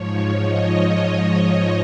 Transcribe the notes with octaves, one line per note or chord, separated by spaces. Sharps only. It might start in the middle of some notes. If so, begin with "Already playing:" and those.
Already playing: G#2 F3 C#5
D#5